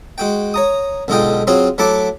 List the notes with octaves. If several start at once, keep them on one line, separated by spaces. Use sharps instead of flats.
G#3 F#4 G5
C#5 A#5 D#6
B1 D3 G#3 F4 D#5 G5
F#3 C4 F4 F#4 G#4 C#5
F#3 A3 E4 F#5 A5 D6